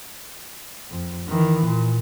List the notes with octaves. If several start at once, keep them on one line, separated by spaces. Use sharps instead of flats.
F2
D#3 E3
A#2